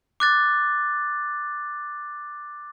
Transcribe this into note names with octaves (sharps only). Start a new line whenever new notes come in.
D6 F#6 A6